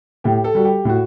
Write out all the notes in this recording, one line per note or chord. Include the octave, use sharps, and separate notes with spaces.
A2 G4
A4
G3 F#4
G4
A2 F#4